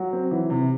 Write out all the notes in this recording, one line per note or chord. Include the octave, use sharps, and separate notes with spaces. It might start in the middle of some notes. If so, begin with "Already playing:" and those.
Already playing: F#3
C4
E3
C3